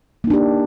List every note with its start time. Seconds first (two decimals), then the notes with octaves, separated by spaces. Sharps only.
0.24 A#3
0.27 D#4
0.30 D4
0.33 G4